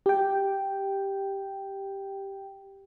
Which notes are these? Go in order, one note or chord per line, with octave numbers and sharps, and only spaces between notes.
G4 G5